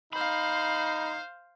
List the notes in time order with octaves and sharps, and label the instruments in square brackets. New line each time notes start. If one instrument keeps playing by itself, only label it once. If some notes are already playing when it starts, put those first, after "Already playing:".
[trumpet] D#4 [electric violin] C5 F5 [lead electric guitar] B5